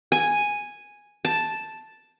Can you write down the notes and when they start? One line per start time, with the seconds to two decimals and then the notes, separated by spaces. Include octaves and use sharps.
0.12 G#5
1.25 A5